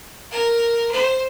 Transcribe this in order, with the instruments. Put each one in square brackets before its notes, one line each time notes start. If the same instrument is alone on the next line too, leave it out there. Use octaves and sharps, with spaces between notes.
[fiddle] A#4
C5